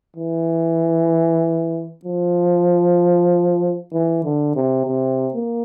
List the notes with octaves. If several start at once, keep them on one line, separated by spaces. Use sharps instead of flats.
E3
F3
E3
D3
C3
C3
A#3